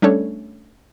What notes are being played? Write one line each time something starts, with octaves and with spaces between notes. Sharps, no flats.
G3 A3 C#4 D4 A4 C#5